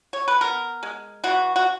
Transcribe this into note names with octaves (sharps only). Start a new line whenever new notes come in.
C#5
B4
B3 A#4
G#3
E3 F#4
F#4